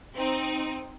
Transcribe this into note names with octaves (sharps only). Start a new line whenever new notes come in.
C4 D#4